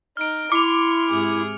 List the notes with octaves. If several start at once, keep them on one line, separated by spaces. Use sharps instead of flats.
D#4 F6 D7
E4 C6 D6 C#7 F7
G#2 C3 G#4